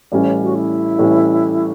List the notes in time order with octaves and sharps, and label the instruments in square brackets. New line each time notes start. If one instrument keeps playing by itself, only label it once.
[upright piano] A1 A2 G3 C#4
[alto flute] F#4
E4
[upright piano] A1 A2 G3 C#4